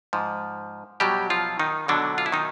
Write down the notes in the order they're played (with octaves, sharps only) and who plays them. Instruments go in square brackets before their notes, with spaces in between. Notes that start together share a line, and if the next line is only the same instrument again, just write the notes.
[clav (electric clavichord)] G#2 F3
B2 F#3 G3 G4
F3 F4
D#3 D#4
B2 D3 F#3 D4
F4
E4
D#3 D#4